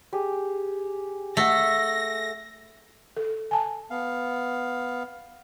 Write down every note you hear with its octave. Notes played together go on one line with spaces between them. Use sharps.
G4 G#4
A3 D#5 F#5 A#6
A4
G#5 A5
B3 F5